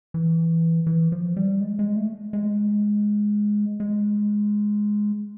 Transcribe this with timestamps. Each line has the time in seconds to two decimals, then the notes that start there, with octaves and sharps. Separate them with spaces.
0.14 E3
0.87 E3
1.12 F3
1.37 G3
1.60 G#3
1.79 G#3
1.96 A3
2.33 G#3
3.80 G#3